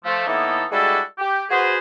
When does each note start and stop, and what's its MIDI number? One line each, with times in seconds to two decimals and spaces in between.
0.05 0.26 53
0.05 0.26 57
0.27 0.64 45
0.27 0.64 52
0.27 0.64 58
0.27 0.64 59
0.27 0.64 63
0.27 0.64 69
0.72 1.00 55
0.72 1.00 56
0.72 1.00 62
0.72 1.00 64
0.72 1.00 66
0.72 1.00 69
1.18 1.43 67
1.50 1.78 66
1.50 1.78 68
1.50 1.78 71
1.50 1.78 72